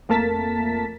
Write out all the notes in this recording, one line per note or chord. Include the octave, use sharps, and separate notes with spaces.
F2 A3 A#3 A#4 A5 B6